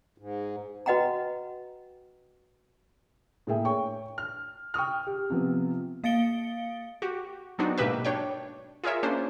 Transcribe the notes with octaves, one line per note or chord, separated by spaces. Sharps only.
G#2
F#4 B4 D#5 F#5 G5 A#5
A2 A#3 G#4 E5 G5
C#5 G5 C#6
F6
G5 C#6 D#6 F6
G4
C3 F3 B3 C4
A#3 F5 A6 C#7 D7 G7
F#4 G4
F#3 B3 C4 D4 D#4 F#4
G#2 B2 A#3 G4 B4 E5
D4 C#5 G5
F4 G#4 A#4 C#5 E5
A#3 C#4 D4 C5